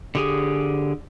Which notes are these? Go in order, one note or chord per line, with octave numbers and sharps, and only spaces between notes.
D3 G4 G#4